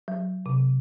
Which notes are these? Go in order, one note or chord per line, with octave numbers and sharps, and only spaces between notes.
F#3
C3